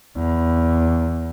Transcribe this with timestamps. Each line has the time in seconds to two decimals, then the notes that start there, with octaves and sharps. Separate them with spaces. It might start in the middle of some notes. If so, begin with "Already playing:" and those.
0.16 E2